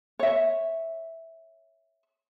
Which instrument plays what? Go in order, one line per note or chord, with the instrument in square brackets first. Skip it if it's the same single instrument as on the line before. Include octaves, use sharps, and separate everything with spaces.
[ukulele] C#5 E5